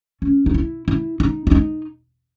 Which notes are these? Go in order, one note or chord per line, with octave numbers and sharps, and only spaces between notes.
C#4
D#4
E4
E4
D#4
E4
D#4